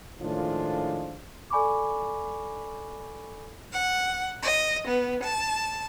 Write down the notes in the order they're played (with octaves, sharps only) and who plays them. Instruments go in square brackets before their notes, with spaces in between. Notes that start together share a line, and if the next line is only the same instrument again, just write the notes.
[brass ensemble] A2 D#3 F3 G#3 D4 F4
[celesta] A4 D5 G#5 B5 C#6 D6
[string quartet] F#5
D#5
B3
A5